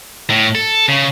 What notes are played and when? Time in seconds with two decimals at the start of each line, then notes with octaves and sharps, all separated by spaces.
0.30 A2
0.55 A4
0.88 C#3